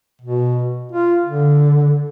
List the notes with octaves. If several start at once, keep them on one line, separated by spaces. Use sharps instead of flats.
B2
F4
D3